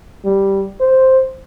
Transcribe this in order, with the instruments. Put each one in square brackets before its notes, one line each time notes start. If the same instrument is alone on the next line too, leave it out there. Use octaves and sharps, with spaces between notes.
[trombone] G3
C5